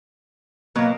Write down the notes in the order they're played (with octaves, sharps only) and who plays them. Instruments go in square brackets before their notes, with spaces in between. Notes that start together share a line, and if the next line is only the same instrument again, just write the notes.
[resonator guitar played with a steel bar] B2 F#3 A#4 [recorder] A#3